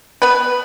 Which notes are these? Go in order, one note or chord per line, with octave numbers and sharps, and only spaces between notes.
B3 B4